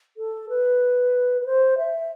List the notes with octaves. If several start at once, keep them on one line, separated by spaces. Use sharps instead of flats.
A4
B4
B4
C5
E5